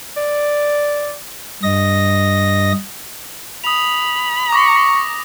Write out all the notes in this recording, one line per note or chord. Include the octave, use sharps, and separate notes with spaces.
D5
G2 D#5 A#6
B5 D#6 F7
C#6 D6 A#6